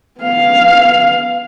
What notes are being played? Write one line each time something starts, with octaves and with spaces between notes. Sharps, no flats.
B3 F5